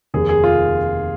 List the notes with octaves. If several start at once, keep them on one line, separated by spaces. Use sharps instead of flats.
F1 D#2 D#3 G#4
G#4
F4